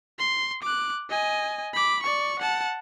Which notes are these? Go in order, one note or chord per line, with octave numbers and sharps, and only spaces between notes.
C6
D6 F#6
D#5 G#5
B5 D6
D5 C#6
F#5 A5